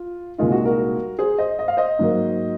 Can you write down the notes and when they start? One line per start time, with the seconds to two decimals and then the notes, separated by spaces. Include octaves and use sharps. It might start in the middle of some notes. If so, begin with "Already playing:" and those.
Already playing: F4
0.38 C2 A#2 G#3 D#4 F4
0.52 F#4
0.65 F#4 A#4
1.19 G#4 C5
1.38 C5 D#5
1.59 D#5
1.68 F5
1.77 C5 D#5
1.99 G#2 F#3 A#3